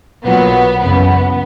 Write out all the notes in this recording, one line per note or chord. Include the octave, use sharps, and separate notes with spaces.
B1 A#2 F#3 B3
F#2 C#3 E3 B3